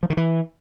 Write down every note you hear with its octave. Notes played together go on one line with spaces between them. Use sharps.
F3
D#3
E3